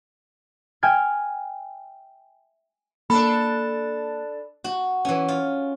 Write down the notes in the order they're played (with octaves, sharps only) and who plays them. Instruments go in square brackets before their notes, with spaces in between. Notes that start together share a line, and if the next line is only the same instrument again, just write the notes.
[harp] E5 G5 G#5 F6 G#6
[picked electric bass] A#3 [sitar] D4 A4 [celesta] B5
[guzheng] F#4
E3 C#4
F4